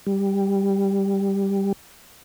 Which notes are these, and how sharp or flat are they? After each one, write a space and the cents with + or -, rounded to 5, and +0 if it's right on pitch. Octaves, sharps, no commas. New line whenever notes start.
G3 +5